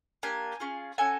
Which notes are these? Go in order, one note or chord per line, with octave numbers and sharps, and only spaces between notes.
A#3 D4 G4 G#5
C#4 F4 G#4
C#4 F#4 A4 G#5